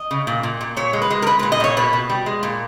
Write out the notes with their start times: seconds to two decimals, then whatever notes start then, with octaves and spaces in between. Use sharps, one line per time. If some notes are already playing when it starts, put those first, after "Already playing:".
Already playing: D#5
0.11 C#3
0.27 A#2
0.43 A#2
0.61 A#2
0.77 A#2 C#5
0.93 G#3
1.02 B4
1.10 G#3
1.22 A#4
1.27 G#3 B4
1.39 A#2 B4
1.52 D#5
1.60 A#2 C#5
1.77 B2 B4
1.93 B2
2.10 G3
2.26 G#3
2.43 A#2